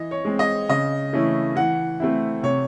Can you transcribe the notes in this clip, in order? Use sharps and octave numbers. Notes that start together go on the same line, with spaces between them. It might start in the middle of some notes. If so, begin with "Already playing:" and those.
Already playing: E3 D#5
C#5
G#3 C4
D#5
C#3 D#5
E3 A3 C#4 E4
E3 F#5
A3 C4 E4
C3 C#5